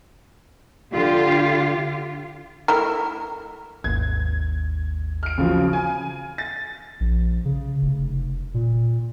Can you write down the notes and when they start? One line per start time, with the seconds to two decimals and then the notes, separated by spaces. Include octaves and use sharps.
0.92 D3 F4 G4
2.68 A3 E4 A#4
3.84 G#1 D#2 G#6
5.23 F6 D7
5.38 C#3 F3 F#3
5.73 G#5
6.38 A6
7.00 A#1
7.45 C#3
7.82 F1
8.54 A#2